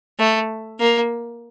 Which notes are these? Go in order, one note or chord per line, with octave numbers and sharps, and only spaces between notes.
A3
A#3